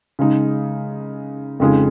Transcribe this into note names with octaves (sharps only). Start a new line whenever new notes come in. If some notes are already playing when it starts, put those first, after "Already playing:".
C#3 G#3 D#4
F2 C#3 G#3 D#4 G#4